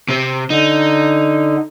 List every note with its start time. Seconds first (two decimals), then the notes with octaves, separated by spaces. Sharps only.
0.09 C3 C4
0.50 D3 D#4